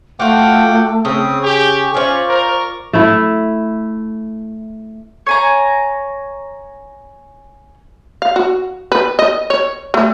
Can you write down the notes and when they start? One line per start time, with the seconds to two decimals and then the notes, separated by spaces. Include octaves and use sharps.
0.20 A3 F4 F#4 F#5 G5 D6
1.05 C#3 C4 D#6
1.43 G4 G#4 C#6
1.95 C#4 F4 C5 D5
2.28 A#4
2.93 A3 E4
5.27 C#5 G#5 A#5
8.22 F5
8.36 F#4
8.92 B4
9.19 D#5
9.50 C#5
9.94 A3